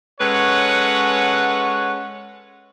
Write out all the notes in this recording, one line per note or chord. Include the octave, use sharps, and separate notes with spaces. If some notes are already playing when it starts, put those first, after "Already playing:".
G#3 C#4 A4 B4 C#5 F#5